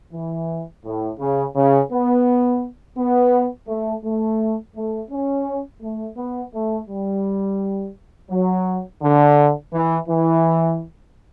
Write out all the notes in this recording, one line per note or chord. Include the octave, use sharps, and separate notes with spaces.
E3
A2
C#3
C#3
B3
B3
A3
A3
A3
C#4
A3
B3
A3
G3
F#3
D3
E3
E3